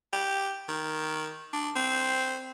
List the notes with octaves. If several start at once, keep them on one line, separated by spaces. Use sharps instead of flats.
G4
D#3
D4
C4